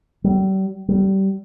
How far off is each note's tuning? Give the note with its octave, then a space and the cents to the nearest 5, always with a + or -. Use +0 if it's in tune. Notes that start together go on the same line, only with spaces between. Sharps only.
G3 -40
G3 -25